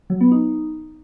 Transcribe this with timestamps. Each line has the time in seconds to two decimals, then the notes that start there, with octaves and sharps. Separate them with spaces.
0.10 F#3
0.21 B3
0.31 D#4